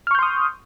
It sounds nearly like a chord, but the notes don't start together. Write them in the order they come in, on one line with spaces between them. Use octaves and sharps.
F6 C#6 G6 C6 D#6